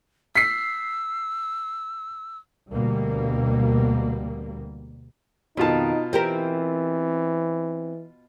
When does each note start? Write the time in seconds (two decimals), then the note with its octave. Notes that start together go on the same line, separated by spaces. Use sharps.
0.35 E6 B6 C7
2.72 D2 B2 G3 A#3
5.57 F2 B2 D#3 D#4 F4 A5
6.13 E3 C4 G4 A#4